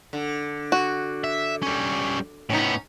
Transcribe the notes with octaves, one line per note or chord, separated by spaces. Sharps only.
D3
F#4
E5
G3 C#4
A2 B3 C#4 D#4